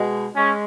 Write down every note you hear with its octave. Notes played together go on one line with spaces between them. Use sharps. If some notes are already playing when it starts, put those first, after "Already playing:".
Already playing: B2 G#3
G#3 C#4